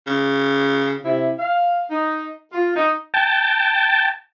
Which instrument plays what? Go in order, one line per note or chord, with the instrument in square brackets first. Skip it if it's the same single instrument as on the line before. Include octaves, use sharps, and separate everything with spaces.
[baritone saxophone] C#3
[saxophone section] C3 E4
F5
D#4
F4
D#4
[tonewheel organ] G5 A5